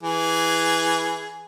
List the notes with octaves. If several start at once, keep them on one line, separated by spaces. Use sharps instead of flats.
E3 G#4